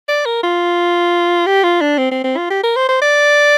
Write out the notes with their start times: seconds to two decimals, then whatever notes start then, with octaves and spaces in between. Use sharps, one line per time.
0.09 D5
0.26 A#4
0.43 F4
1.46 G4
1.64 F4
1.81 D4
1.98 C4
2.11 C4
2.24 C4
2.37 F4
2.50 G4
2.63 A#4
2.76 C5
2.89 C5
3.02 D5